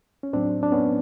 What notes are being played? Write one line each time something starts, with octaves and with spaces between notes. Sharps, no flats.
C#4
A2 F#3 C4 D4
D4
B3 C#4